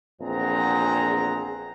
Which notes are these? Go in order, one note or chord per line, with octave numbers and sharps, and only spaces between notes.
A#1 E2 C4 G#4 F#5 A#5